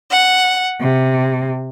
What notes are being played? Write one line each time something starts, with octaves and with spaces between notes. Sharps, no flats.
F#5
C3